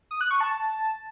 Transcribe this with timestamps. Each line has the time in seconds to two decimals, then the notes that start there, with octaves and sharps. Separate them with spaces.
0.11 D#6
0.21 F#6
0.31 C#6
0.41 A5